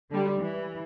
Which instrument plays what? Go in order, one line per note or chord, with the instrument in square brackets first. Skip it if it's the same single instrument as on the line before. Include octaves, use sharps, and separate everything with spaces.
[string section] D3 G3
E3